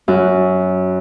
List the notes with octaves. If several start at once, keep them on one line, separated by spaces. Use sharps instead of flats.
F#2